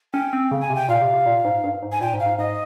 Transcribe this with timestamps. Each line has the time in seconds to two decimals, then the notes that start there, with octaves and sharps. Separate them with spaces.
0.13 C#4 G5
0.33 C4
0.51 C#3
0.61 G#5
0.70 C3
0.75 G5
0.89 A#2 F5
1.01 C3
1.14 C3
1.26 A#2
1.45 G#2
1.64 G2
1.82 G#2
1.92 G#5
2.01 A#2 G5
2.14 G#2
2.20 F5
2.26 G#2
2.38 G#2 D#5